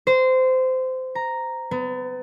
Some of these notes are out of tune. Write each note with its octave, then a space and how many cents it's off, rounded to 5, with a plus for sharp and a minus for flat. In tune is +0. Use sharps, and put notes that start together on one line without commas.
C5 -20
A#5 +0
B3 +35